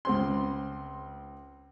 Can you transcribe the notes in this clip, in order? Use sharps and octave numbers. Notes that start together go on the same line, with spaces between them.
C#2 C4 C6